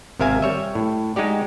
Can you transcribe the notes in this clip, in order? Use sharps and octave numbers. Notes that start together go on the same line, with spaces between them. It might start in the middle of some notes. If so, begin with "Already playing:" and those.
G#1 C3 A#4 E5 F5 G#5
G3 C#5 E5
A2
G#3 D#4 F#4 G4 D5